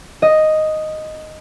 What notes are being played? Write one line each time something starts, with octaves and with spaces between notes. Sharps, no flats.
D#5